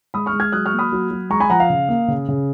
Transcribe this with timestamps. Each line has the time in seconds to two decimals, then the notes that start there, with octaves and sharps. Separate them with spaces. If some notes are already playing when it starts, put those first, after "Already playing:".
0.14 G#3 B5 D#6
0.26 C#6 F6
0.33 G#3
0.40 F6 G#6
0.52 F#3 D#6 F#6
0.66 C#6 F6
0.73 A#3
0.79 B5 D#6
0.92 F#3
1.11 F#3
1.30 G#3 A#5 C#6
1.40 G#5 B5
1.50 F3 F#5 A#5
1.60 F5
1.70 C#3
1.89 A#3
2.08 C#3
2.28 C#3